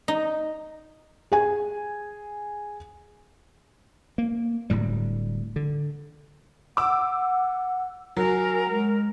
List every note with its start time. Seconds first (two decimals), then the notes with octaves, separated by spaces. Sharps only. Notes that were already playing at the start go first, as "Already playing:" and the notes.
0.08 D#4
1.32 G#4 G#5
4.18 A#3
4.70 D1 D2 A2 G3
5.56 D3
6.77 F#5 D6 E6
8.17 F#3 A#4 G#5
8.70 G#3